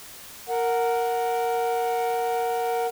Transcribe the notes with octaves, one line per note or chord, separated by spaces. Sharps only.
A#4 F#5